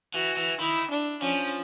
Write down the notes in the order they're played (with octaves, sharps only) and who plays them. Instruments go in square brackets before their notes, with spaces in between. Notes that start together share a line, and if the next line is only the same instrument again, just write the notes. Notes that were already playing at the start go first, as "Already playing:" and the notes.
[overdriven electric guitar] E3 [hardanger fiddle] F#4
[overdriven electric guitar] E3
[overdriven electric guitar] D#3 [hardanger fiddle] E4
[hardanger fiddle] D4
[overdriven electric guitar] F3 [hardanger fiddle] C#4